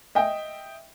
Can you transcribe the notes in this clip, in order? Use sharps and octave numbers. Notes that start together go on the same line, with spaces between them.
D#5 E5 G5